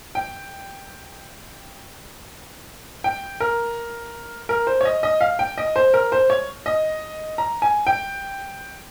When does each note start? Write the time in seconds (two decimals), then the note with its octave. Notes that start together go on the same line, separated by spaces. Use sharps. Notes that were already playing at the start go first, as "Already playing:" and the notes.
0.15 G5
3.04 G5
3.40 A#4
4.49 A#4
4.67 C5
4.81 C#5
4.85 D#5
5.03 D#5
5.21 F5
5.39 G5
5.58 D#5
5.76 C5
5.94 A#4
6.12 C5
6.30 C#5
6.66 D#5
7.38 A#5
7.62 G#5
7.87 G5